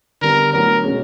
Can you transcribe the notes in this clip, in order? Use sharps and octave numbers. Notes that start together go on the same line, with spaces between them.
D3 G3 B3 A#4
A2 F#3 B3 D4 A#4
B2 G#3 C#4